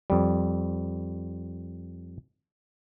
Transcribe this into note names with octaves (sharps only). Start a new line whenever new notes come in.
F2 G3